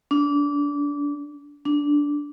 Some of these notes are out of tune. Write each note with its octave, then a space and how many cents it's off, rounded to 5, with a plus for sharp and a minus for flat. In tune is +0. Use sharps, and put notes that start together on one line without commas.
D4 -25
D4 -10